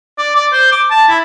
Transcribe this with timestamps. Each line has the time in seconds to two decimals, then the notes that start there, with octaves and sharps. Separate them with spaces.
0.18 D5
0.36 D5
0.52 C5
0.71 D6
0.91 A5
1.08 E4